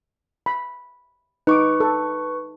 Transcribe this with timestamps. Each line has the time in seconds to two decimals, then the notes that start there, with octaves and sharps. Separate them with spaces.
0.46 B5
1.47 D#4 B4 C#6 D6
1.80 A4